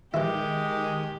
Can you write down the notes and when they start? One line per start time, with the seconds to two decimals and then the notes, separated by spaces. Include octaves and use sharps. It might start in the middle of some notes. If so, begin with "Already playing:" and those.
0.14 D#3 E3 G#3 E4 G4